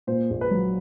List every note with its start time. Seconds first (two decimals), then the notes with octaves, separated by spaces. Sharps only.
0.07 A#2 C5
0.30 A#1
0.41 B4
0.51 F#3